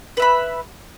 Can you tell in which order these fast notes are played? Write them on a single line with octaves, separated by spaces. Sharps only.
B4 E5 B5